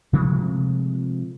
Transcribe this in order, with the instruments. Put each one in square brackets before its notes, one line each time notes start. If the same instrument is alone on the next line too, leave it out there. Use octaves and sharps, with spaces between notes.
[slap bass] C3 F3 G#3 A3